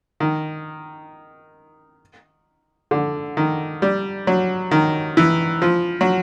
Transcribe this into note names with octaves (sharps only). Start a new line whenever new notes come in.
D#3
D3
D#3
G3
F#3
D#3
E3
F3
F#3